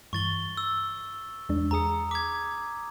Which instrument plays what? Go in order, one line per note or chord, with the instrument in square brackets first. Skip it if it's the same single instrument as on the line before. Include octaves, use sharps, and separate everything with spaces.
[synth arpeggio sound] G2 E3 [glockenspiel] C#6 A6 G7
[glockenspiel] E6
[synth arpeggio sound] E2 G#3 D4
[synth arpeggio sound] E2 G#4 C#7 [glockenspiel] A#5 D#6
[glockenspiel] D6 G#6 [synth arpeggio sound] B6